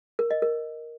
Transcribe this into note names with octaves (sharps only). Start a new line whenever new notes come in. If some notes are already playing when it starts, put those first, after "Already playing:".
A#4
D#5
A#4